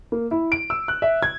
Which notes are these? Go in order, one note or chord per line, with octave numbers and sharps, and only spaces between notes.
A#3
E4
D7
E6
F#6
E5
G#6